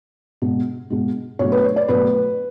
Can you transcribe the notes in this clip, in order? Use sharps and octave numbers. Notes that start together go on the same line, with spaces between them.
B2 G#3
B2 G#3
B2 F#3 A3 C#5
B4
C#5
D5
B2 F#3 A3 B4